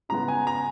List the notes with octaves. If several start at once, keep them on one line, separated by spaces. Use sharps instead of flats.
C#3 G#3 B3 A#5
G#5
A#5